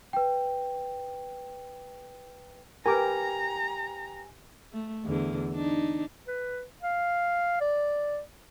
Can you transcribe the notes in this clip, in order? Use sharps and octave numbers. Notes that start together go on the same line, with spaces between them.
B4 G5
G4 A#4 B4 G5 G#5 A#5 D6
A3
E2 D3
D4 D#4
B4
F5
D5